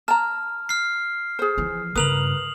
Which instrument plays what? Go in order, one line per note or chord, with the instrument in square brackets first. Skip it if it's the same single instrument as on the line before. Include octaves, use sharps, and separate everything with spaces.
[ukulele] A5 A#5 [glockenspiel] F6
[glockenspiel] F6 C7
[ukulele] G#4 C5
[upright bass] E3 F3
[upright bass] G2 C#3 [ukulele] A#4 B4 [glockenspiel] D#6 F7 F#7